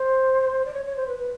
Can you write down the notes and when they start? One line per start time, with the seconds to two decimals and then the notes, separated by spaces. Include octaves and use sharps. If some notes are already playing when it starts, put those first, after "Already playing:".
Already playing: C5
0.65 D5
0.74 C#5
0.85 C#5
0.96 C5
1.07 B4
1.18 B4